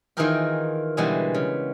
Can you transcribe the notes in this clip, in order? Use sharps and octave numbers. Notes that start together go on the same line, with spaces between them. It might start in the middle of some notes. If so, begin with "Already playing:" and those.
D#3 E3 F4 G#4 A#4 G5
B2 D3 E3 G3 G#3 B3
C#3